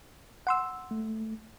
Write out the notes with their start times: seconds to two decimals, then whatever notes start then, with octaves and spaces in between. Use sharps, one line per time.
0.47 F#5 C6 E6
0.91 A3